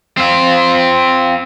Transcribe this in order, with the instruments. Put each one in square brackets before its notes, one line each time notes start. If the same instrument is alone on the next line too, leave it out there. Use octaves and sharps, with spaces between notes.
[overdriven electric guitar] C4 F4